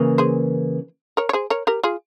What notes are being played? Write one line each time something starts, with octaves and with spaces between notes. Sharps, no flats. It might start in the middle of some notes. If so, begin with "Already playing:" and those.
Already playing: C#3 E3 A#3
G#4 C5
A#4 C#5
C#5
G#4 C5
A#4 C#5
G4 A#4
F4 G#4